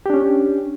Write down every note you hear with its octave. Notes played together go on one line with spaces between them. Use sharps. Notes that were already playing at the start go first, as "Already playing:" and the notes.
C#4 D4 G4